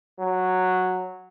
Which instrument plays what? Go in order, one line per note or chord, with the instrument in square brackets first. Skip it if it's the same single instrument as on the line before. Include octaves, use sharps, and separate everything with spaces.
[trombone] F#3